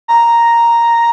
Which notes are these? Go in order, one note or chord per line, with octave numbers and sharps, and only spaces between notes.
A#5